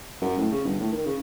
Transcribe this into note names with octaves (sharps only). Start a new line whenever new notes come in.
F#2
A2
C#3
G1
A2
D#3
C#3